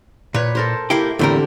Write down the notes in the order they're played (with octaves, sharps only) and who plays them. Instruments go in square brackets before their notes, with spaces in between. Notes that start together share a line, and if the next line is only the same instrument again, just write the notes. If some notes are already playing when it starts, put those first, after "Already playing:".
[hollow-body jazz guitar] A#2 [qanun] B4 C#5
[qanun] A4 A#4 C5
[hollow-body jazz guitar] A#3 E4 G4
[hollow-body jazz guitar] E2 A2 A#4 [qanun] D3 C4 G4